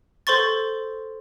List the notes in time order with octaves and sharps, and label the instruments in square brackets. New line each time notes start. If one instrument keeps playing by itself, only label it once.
[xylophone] A4 C5 C6 C#6 A6